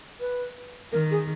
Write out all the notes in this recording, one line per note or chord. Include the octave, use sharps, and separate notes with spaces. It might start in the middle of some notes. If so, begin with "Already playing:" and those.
B4
D#3 A#4
G#4